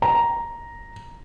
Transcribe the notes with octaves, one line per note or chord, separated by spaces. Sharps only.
A#5